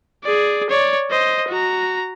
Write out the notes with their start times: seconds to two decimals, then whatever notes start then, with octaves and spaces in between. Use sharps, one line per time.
0.24 G#4 D5
0.70 C#5 D5
1.11 C5 D#5
1.48 F#4 A#5